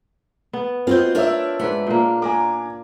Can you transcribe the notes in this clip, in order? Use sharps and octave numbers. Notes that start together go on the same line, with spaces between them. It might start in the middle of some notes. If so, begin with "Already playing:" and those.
B3
C4 F4 F#4 D#5 G6
D4 F4 A#4 C#5 E5 E6
G#2 D4 B4 F#5
A#2 A#3
A#3 G#5 A#5 D6